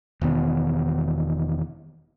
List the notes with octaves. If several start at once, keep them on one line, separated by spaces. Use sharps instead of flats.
E1 D#3 B3